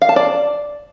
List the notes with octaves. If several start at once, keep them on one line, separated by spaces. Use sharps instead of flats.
F5
A5
D5